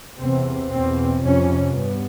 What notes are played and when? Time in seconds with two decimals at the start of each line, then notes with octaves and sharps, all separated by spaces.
0.20 E2 C3 C4
0.72 E2 B2 C4
1.22 F2 C3 C#4
1.73 G2 B3